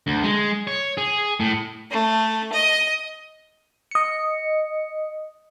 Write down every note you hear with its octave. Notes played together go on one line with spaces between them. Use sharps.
D2
G#3
C#5
G#4
A2
A3
D#5
D#5 C#7